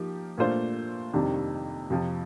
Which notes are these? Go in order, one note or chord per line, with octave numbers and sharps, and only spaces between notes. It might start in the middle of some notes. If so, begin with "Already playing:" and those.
Already playing: F3 A#3 D#4 G4
A#2 A3 D4 F4 C5
F2 C3 D#3 G3 D4
F2 C3 F3